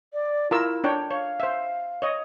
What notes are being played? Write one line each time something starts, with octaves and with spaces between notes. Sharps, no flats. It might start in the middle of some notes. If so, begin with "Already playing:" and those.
D5
E4 F4 A#4 E6
D4 C#5 G5
C#5 F5
C5 E5
C#5 D#5